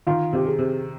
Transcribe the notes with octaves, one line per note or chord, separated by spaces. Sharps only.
D#3 F4
C3 G4
G#4
C3